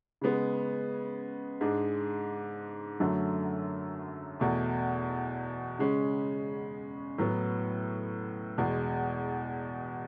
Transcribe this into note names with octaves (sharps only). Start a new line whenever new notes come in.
C#3 G#3 B3
G#2 G#3 D4
F#2 D3 F#3 A3
E2 B2 A3
C#3 G#3 C#4
A2 F#3 B3
E2 B2 G#3